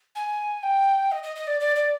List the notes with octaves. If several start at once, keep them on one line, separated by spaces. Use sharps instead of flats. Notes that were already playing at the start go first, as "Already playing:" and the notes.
G#5
G5
D#5
D#5
D#5
D5
D5
D5